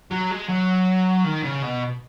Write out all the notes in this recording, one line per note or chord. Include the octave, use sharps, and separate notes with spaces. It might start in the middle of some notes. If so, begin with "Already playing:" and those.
F#3
G#3
F#3
D#3
C#3
B2